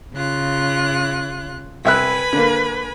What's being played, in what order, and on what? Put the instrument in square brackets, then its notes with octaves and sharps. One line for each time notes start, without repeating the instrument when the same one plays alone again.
[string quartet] C#3 F4 F#6
[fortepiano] C2 E5 F#6 [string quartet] B4 G#5 B5
[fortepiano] D3 A#3